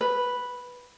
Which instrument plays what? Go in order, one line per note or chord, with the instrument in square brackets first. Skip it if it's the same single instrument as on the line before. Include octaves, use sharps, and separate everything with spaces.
[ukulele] B4